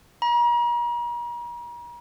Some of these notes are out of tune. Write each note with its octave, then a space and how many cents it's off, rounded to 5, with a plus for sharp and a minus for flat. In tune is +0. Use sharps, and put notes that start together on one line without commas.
A#5 +40